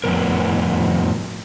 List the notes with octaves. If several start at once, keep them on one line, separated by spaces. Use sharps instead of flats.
F2 A2 D#3 B3 A#4